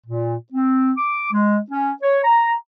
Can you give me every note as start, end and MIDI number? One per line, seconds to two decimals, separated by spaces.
0.06 0.36 46
0.52 0.92 60
0.97 1.31 86
1.32 1.59 56
1.71 1.92 61
2.03 2.19 73
2.24 2.54 82